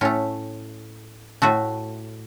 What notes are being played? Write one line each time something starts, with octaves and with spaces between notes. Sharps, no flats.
A2 A3 C#4
A2 A3 F#4